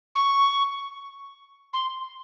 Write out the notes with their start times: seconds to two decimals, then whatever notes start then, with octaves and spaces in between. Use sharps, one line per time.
0.15 C#6
1.73 C6